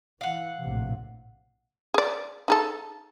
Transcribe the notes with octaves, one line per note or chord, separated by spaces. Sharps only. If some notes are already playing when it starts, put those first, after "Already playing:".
E3 F5 F#5
A#1 A2 C3
G#4 D5
D#4 G#4 A4